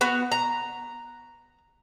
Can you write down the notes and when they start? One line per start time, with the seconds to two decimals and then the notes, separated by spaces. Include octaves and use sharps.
0.01 B3 F#4
0.32 A#5